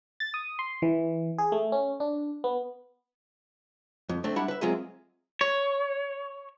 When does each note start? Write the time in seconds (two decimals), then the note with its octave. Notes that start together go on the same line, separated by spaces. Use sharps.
0.20 A6
0.34 D#6
0.59 C6
0.82 E3
1.38 G#4
1.52 A3
1.72 C#4
2.00 D4
2.44 B3
4.09 F2
4.24 A3 C4 D4
4.36 G3 D4 E4 F#5 B5
4.48 B4 E5
4.61 F#3 G#3 C4 F4 G#4 E5
5.41 C#5